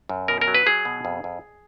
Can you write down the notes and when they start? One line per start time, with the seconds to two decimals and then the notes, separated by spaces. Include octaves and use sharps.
0.09 F#2
0.28 B2 A#4
0.41 A#4
0.47 F#3
0.55 B4
0.66 F#3 G#4
0.85 B2
1.05 F2
1.24 F2